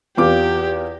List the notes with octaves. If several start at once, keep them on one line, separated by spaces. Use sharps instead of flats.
E2 F4 G4 D6